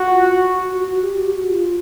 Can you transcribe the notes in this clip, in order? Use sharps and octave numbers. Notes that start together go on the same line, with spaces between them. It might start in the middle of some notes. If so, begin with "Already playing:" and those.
Already playing: F#4
F4
F#4
F#4
G4
F#4
F4